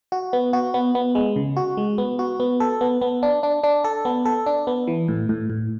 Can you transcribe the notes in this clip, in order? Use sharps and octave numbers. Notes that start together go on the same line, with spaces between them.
F#4
B3
F#4
B3
B3
G#3
C#3
F#4
G#3
B3
F#4
B3
A4
B3
B3
D4
D4
D4
A4
B3
A4
D4
B3
E3
A2
A2
A2